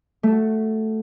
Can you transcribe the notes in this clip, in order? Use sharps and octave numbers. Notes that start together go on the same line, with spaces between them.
A3 F#4 A4